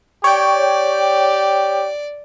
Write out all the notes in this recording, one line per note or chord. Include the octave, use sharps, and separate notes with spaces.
G4 C#5 D5 G5